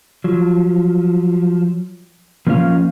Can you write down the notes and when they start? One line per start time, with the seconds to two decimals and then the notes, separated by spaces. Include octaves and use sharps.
0.24 F3 F#3
2.47 F3 A#3 C#4 B4 F5